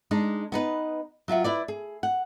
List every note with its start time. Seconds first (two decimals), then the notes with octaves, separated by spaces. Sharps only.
0.11 G#3 D4 D#4
0.52 B3 D#4 B4
1.28 F#3 F4 E5 F#5
1.44 E4 B4 D5
1.68 G#4
2.03 F#5